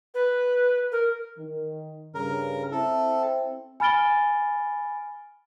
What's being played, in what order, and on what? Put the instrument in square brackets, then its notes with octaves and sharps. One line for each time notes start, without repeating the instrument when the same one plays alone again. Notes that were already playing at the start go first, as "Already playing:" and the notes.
[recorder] B4
A#4
[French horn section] D#3
[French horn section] G2 C#3 [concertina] A#4
[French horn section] C4 E4 [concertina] A4
[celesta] G#5 B5 F6 A6 D7 G7